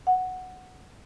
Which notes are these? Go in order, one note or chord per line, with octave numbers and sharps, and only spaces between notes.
F#5